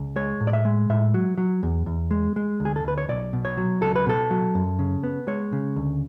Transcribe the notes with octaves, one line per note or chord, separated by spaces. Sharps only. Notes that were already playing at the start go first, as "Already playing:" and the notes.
Already playing: C#2
G#3 C#5
A2
D5
E5
G#3
A2 E5
F#3
F#3
E2
E2
G#3
G#3
D2
G#4
A4
D2 B4
C#5
B1 D5
B2
C#5
F#3
C#2 A4
B4
B2 A4
F#3
F#2
C#3
B3
G#3 C#5
C#3
D2